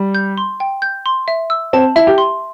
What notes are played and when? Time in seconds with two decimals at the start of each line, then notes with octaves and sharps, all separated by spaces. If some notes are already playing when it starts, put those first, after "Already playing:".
Already playing: G3
0.15 G6
0.38 C6
0.60 G5
0.82 G6
1.06 C6
1.28 E5
1.50 E6
1.73 C4 A5
1.96 E4 E5
2.07 G4
2.18 C6